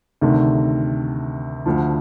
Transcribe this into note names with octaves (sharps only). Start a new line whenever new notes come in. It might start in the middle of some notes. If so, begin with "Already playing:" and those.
D2 C3 D#3 A3
D2 D3 F3